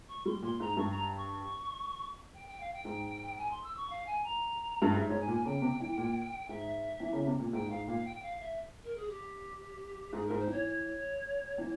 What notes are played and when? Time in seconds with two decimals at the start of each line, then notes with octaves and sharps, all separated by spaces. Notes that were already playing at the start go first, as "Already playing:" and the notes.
0.08 C#6
0.25 G3 C6
0.42 A#2 C6
0.60 G#2 A#5
0.77 G2 C#6
0.91 A#5
1.17 C#6
2.34 G5
2.47 G5
2.60 F5
2.73 G5
2.85 G#2
3.37 G#5
3.51 C6
3.63 E6
3.76 C#6
3.89 F5
4.06 G#5
4.24 A#5
4.82 G2
4.93 G#2 E5
5.07 G#2 C#5
5.20 G#5
5.28 A#2
5.32 G#5
5.45 C#3 G5
5.62 C3
5.80 E3
5.98 A#2
6.49 G#2 E5
7.00 E3
7.13 C#3
7.27 C3
7.40 A#2
7.53 G#2 G5
7.70 G#2 F5
7.88 A#2 F5
8.04 G5
8.22 F5
8.40 E5
8.83 A#4
8.96 G#4
9.09 G4
10.13 G#2 G#4
10.25 G#2 A#4
10.38 C5
10.47 E3 C#5
10.65 C#5
11.58 E3